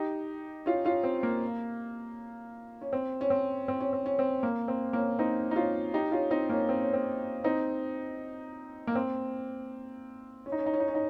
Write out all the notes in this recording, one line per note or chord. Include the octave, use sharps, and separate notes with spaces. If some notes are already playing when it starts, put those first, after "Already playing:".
Already playing: D#4 G4
C#4 F4
C#4 F4
C4
A#3
C#4
C4
C#4
C4
C4
C#4
C4
C#4
C4
A#3
C4
A#3 C#4
C4 D#4
D#4
C#4 F4
D#4 G4
C#4 F4
C4 D#4
A#3 C#4
C4
C#4
C4
C4 D#4
A#3
C4
C#4
D#4
C#4
D#4
C#4
D#4
C#4
D#4